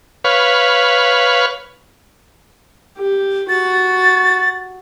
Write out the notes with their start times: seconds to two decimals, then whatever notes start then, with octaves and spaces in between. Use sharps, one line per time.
0.24 B4 C#5 F5
2.97 G4
3.49 F#4 A6